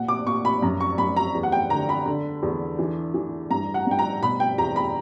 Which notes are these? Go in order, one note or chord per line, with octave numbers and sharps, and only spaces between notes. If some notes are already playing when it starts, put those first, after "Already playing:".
Already playing: A#2 F#5
D6
A#2 C#6
B5
F#2 A#5
C#6
F#2 B5
A#5
E2
F#5
G5
D3 A#5
B5
D3
E2
E3
E3
G2 A#5
F#5
G2 G5
A#5
B2 B5
G5
E2 A#5
B5